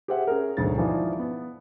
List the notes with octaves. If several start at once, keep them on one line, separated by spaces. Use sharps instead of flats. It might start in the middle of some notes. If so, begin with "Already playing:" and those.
G4 G#4 C5 E5 F#5
C#4 G#4 A#4
E1 D2 G#2 F#3 G#4 A6
E3 F3 D4 D#4
B3